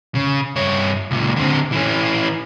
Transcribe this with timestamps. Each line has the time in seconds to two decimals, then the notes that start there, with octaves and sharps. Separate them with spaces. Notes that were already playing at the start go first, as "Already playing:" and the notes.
0.15 C#3
0.56 G2 C#5
1.11 C#2 A#2
1.36 D3 C4
1.72 E3 C#4